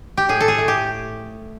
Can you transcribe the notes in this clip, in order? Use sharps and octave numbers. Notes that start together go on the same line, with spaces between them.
G4
A2 G#4
A4
G#4
A3
G4